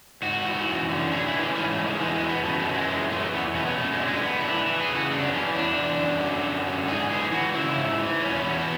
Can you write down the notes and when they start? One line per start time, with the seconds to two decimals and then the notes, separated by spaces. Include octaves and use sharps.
0.22 G#2 F#4
0.45 E3
0.68 F#2
0.89 D3
1.11 A2 G#4
1.27 E4
1.34 E3
1.41 C#4
1.55 G#2 C#4
1.70 A3
1.77 E3
1.85 G#3
2.00 E2 G#3
2.16 G#3
2.23 B2
2.29 B3
2.44 F#2 A3
2.60 G#3
2.67 E3
2.74 G#3
2.89 F#2 G#3
3.11 E3 A3
3.34 E2 B3
3.55 B2 C#4
3.67 B3
3.77 F#2 A3
3.92 G#3
3.99 D3
4.08 G#3
4.22 A2 B3
4.38 E4
4.44 E3 D4
4.67 E3
4.81 G#4
4.88 C#3
4.95 F#4
5.11 F#2 D4
5.25 B3
5.33 E3 C#4
5.55 E2 D4
5.77 D3
5.99 F#2
6.21 D3
6.44 F#2
6.66 D3
6.88 G#2 G#4
7.10 E3 G#4
7.32 E3 F#4
7.54 C#3 E4
7.77 G#2
7.99 E3
8.21 E2 C#4
8.36 A3
8.43 B2 B3